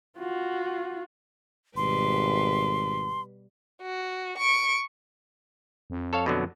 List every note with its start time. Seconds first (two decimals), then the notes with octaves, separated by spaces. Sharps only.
0.19 F4 F#4
1.77 G#1 B2 G3 B4 C6
3.82 F#4
4.38 C#6 D7
5.90 F2
6.13 A4 C#5 F5
6.26 B2 D3 F#3